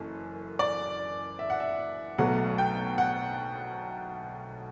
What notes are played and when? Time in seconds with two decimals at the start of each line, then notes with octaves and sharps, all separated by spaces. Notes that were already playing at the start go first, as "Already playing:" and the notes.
Already playing: F#1 F#2 E3 A4
0.59 D5
1.39 E5
1.50 F#5
1.60 E5
2.18 B1 B2 F#3 A3 F#5
2.58 G5
2.98 F#5